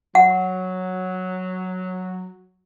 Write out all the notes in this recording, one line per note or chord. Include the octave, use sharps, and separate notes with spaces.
F#3 F#5